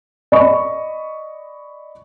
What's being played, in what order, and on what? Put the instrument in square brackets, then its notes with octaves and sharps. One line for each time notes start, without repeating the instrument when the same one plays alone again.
[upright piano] D5 D#5 B5 C#6